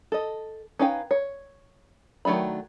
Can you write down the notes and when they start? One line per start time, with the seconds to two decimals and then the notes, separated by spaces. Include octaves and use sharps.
0.12 A4 D#5
0.79 C#4 D#4 B4 F5 G5
1.11 C#5
2.25 D#3 F#3 A3 D4 B5